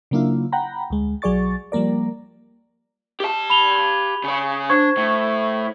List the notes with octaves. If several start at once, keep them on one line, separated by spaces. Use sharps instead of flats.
C#3 F#3 A#3 D4 E4 F4
F#5 G5 A#5 B5
D2 G#3
B1 F#3 G#4 D5 C#6 A6
F3 G3 A#3 A#4 D5
G4 A5
B5 F7 G7
C#3 C#5
D4 C5 C#6 G#6
A2